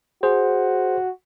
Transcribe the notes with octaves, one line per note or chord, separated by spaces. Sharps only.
F#4 G#4 C5